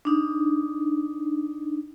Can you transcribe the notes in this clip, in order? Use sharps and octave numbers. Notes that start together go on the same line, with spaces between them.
D4 D#4